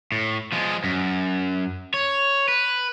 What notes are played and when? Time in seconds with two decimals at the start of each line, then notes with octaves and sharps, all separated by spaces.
0.12 A2
0.52 F3 G#3
0.84 F#2
1.94 C#5
2.48 B4